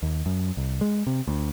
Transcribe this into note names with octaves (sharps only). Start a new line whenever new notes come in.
D#2
F#2
C2
G#3
C3
D2